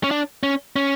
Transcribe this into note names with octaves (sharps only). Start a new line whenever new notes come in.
C#4
D4
C#4
C#4